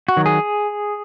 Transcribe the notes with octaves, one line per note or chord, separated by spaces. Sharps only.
F#4
D#3 F#3
G#4